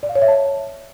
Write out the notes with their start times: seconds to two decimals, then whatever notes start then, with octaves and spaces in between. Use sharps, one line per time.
0.03 D5
0.09 F5
0.15 C#5
0.22 E5
0.28 A5